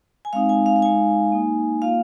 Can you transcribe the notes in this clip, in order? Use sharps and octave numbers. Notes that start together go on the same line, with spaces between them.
G#5
G#3 C4 D#4 F5
G#5
F5
F5
G#3 D#4 G#5
A#3 D#4
A#3 F4 F5